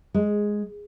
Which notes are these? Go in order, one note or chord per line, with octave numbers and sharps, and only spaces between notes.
G#3